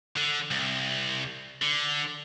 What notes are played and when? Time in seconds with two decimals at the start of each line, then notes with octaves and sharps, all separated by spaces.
0.17 D3
0.51 C2
1.62 D3